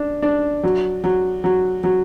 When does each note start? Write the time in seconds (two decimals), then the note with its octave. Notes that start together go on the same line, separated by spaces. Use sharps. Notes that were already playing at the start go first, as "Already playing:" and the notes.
Already playing: D4
0.22 D4
0.63 F#3
1.04 F#3
1.44 F#3
1.84 F#3